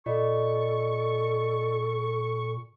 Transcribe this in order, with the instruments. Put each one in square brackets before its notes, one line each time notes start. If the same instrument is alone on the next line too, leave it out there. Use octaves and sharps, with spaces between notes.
[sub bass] A#2 [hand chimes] F4 D5 D#5 [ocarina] A4 [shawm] C#6